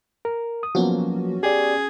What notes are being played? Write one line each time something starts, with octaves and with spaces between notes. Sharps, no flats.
A#4
D#6
F3 F#3 A#3 B3 C#4 F#4
G4 G#4 D5